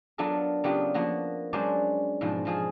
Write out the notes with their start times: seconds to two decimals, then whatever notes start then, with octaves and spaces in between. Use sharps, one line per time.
0.18 F#3 B3 D4 F4 A4 A#4
0.64 C#3 F#3 B3 D4 F4 G4
0.94 F3 A#3 B3 F#4
1.53 F#3 G#3 C#4 D4 C5 D5
2.21 G#2 B2 F3
2.45 B2 F3 G#4